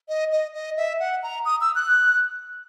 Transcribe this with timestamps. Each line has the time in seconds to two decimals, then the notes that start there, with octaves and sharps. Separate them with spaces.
0.09 D#5
0.31 D#5
0.54 D#5
0.77 E5
1.00 F#5
1.23 A#5
1.45 D#6
1.61 E6
1.75 F#6